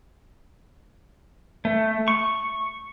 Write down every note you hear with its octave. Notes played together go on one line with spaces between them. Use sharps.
A3
C#6